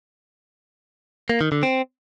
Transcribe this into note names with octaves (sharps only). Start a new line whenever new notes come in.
A#3
D#3
D3
C4